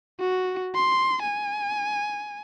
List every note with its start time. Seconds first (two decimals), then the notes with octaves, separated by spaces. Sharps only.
0.20 F#4
0.75 C6
1.22 G#5